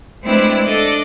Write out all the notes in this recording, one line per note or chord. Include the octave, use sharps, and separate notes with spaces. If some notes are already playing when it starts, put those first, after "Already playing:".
G#3 A3 C4 D4 E4 B4
D4 A4 D5 D#5